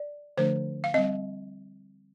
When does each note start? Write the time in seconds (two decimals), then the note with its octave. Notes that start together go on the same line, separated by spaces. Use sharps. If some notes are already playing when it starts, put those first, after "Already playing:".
Already playing: D5
0.37 D3 F3 A3 D4 C5
0.84 F5
0.94 G3 C4 D#5